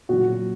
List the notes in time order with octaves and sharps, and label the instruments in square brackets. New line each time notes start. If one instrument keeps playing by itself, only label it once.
[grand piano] A#2 F#3 F#4